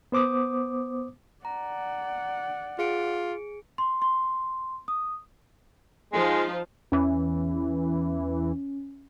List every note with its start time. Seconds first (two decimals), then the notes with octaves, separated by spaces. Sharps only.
0.12 B3 C5 D6 D#6
1.45 D5 F#5 A#5
2.79 F4 G#4 C#7 D7
3.78 C6
4.02 C6
4.88 D#6
6.13 F3 G#3 D#4 F4
6.92 E2 E3 C#4